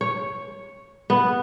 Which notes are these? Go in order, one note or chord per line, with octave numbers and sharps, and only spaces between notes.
C#5
B3